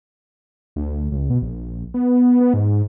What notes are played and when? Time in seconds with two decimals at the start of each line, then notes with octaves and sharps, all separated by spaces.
0.76 D2
1.12 C#2
1.30 B2
1.42 A#1
1.94 B3
2.40 B3
2.54 G#2